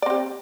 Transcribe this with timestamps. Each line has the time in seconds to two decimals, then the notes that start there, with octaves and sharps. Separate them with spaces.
0.02 D5
0.06 C4
0.10 G4